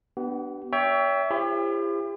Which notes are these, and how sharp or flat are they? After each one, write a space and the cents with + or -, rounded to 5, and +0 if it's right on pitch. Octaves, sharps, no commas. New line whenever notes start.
B3 +0 D4 +0 G4 -40
C#5 +35 E5 +0 G5 +15
E4 +45 G4 +40 C5 +10